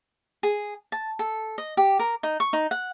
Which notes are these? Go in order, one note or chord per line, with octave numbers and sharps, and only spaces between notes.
G#4
A5
A4
D#5
G4
A#4
D#4
C#6
D#4
F#5